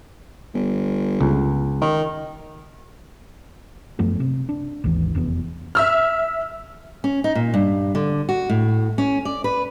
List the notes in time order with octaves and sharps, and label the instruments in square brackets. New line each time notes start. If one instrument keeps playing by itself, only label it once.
[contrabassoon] G1
[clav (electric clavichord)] C#2
[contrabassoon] D#3
[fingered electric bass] F#2 F3 A3 B3
C3
D4
G#1 D#2 E3
F1 E2 G2 B3
[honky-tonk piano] E5 E6 F6
[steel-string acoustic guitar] C#4
D#4
A#2
G2
D3
F#4
A2
C#4
D5
B4